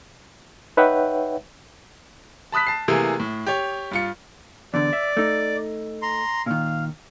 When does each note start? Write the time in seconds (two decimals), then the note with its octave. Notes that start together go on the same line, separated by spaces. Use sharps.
0.77 D#4 B4 C#5 E5 F#5 G5
2.52 A5 B5 D#6 F#6 B6
2.67 A5 C7
2.88 C3 E3 A3 A#3 G#4
3.20 A2
3.46 G4 C#5
3.91 G2 F4 C#7
4.74 E2 D3 D5
4.93 E5
5.17 A3 D#4
6.02 A#5 C6
6.46 A#2 D#3 F5